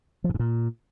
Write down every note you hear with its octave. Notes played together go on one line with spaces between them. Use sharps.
F3
A2
G#2
A#2